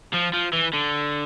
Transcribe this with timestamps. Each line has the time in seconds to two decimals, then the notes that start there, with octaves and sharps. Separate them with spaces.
0.13 F3
0.33 F3
0.53 E3
0.74 D3